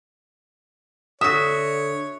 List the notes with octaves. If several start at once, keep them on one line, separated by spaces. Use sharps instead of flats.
D3 F#4 C#5 E5 D#6